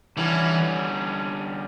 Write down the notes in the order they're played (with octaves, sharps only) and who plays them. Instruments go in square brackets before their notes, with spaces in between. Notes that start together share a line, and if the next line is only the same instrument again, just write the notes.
[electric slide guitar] D3 G3 C#4 [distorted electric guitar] E3